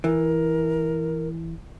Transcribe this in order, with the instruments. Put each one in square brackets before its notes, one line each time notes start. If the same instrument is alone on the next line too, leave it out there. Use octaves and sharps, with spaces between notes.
[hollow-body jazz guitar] E3 [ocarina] A#4